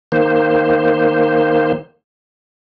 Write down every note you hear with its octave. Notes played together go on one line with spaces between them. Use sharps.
D#3 A#3 C5